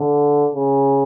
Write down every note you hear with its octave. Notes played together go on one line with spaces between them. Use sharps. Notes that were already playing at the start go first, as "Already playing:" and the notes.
Already playing: D3
C#3